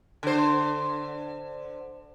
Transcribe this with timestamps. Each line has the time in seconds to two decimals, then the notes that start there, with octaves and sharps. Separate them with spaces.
0.23 D3 C5